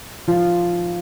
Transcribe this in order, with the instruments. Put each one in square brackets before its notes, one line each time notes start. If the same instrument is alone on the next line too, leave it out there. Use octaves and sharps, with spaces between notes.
[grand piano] F3 F4